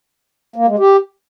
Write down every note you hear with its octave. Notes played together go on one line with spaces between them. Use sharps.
A#3
G#3
G4